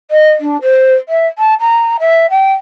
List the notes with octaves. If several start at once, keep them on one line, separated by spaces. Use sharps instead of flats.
D#5
D4
C5
E5
A5
A#5
E5
G5